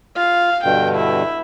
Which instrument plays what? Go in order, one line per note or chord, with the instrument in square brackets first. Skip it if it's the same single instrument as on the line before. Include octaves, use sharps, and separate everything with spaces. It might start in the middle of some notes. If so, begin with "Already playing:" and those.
[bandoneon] F4 [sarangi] F5
[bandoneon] G2 B2 D3 [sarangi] G5
[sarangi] E4